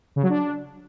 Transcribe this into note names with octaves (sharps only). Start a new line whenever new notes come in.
C#3
F#3
D4